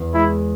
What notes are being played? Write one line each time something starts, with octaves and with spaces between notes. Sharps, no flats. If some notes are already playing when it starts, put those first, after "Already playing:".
Already playing: E2
G#3 E4